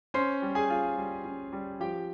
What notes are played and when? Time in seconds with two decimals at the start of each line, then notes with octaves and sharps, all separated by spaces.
0.14 C#4 C5 C6
0.42 G3
0.55 G#4 G#5
0.70 F4
0.97 G3
1.25 C#4
1.53 G3
1.80 F3 G4 G5